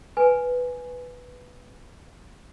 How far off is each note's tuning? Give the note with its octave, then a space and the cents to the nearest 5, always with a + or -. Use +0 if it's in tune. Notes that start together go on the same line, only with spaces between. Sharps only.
B4 +0 G#5 +0